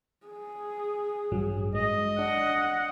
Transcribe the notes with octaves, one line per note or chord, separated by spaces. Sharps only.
G#4
A1 G2 F#3
G#3 D#5
D4 F#5